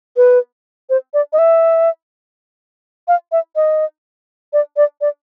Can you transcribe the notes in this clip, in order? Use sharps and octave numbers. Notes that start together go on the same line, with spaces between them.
B4
C5
D5
D#5
E5
F5
E5
D#5
D5
D5
D5